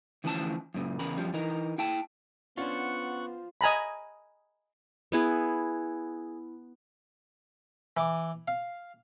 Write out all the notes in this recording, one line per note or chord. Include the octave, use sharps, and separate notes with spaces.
D2 E3 F3 C#4 D#5 A5
F#2 A#2 C#3
E2 C#3 A#4 B5
F#2 F3 G3 C#4
E3 D#4 A#4
E4 G5 A5
B3 C#4 D4 F4 C5 F#5 C#6 F#6
D#5 G#5 A#5 B5
B3 E4 G#4
E3 D6
F5